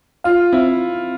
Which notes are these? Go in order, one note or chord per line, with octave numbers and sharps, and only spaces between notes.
F4 F5
C4 E4